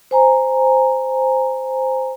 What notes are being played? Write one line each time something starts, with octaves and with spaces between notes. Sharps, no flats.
C5 G#5 A#5